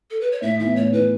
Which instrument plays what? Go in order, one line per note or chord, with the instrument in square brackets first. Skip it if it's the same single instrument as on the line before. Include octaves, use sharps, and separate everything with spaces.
[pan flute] A4
B4
C#5
[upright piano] A2 [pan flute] E5
[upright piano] E3 B3 [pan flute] E5
[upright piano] A2 [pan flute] C#5
[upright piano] E3 B3 [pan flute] B4